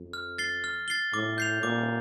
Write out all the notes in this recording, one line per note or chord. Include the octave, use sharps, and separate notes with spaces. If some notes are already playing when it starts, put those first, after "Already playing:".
Already playing: F2
F6
A6 C7 G7
F6
A6 C7 G7
A2 D6
G6 C7 F7
A#2 D6